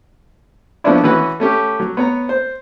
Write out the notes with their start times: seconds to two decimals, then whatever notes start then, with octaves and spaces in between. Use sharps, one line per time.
0.84 F3 A#3 B3 C#4 D4 E4
1.04 E3 C#4 F#4 B4 F#5
1.40 A3 C#4 G4
1.80 F#3
1.97 B3 C#5 A#5
2.29 C5